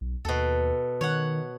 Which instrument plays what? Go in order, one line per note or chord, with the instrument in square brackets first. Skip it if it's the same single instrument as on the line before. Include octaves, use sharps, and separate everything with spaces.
[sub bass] B1
[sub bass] D#2 [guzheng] B2 A4
[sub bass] D#3 [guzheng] C#5 F#5